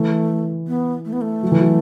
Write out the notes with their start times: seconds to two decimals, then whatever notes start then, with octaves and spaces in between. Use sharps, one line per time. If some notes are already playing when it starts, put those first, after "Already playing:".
Already playing: E3 A3
0.68 B3
1.05 A3
1.13 B3
1.21 A3
1.43 F#3
1.52 E3
1.61 F#3